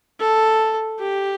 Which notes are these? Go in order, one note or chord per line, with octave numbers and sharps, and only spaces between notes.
A4
G4